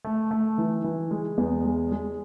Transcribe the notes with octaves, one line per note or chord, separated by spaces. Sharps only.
A3
A3
E3
E3
G#3
E2
G#3
G#3